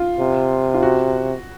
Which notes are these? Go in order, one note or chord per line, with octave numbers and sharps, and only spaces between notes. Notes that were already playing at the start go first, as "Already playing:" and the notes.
Already playing: F4
C3
F4
F#4